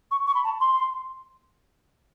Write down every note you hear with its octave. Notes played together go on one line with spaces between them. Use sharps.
C#6
C#6
B5
A5
C6